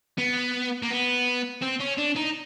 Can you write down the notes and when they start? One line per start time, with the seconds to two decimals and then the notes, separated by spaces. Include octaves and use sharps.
0.18 B3
0.82 A#3
0.90 B3
1.62 C4
1.80 C#4
1.98 D4
2.16 D#4